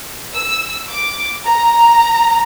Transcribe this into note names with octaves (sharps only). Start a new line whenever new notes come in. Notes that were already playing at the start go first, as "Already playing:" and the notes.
E6
D6
A#5